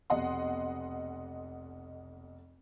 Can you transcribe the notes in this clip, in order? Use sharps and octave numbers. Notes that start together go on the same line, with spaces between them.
F1 B1 D#5 F#5 C6